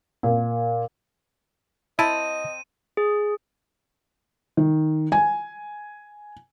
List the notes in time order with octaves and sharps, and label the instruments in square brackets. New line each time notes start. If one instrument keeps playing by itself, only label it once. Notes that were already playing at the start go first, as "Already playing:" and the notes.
[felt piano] A#2
[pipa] C4 A5 [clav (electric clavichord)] E4 [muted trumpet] D#5 [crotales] D#7
[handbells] G#4
[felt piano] D#3
G#5